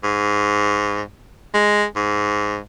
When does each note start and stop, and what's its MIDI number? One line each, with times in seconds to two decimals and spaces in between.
0.04 1.01 44
1.54 1.86 56
1.96 2.59 44